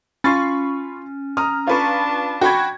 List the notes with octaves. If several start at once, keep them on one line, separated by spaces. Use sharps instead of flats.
C#4 F4 B5 C#6 A6 C7
A#5 D#6 F6
D4 F4 B4 A5 C#6
F#4 G5 B5 C#6 G#6